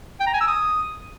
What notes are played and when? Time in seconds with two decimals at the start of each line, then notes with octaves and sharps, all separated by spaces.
0.20 G5
0.27 A#5
0.34 G#5
0.41 E6
0.48 D#6